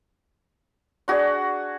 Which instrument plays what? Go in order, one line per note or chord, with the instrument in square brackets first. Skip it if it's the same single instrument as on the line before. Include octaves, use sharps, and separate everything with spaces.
[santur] D4 F#4 G#4 [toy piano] D5 C6